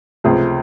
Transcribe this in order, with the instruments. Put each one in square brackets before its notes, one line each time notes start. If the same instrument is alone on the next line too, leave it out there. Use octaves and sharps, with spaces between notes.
[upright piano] C#2 C3 F3 A3 G#4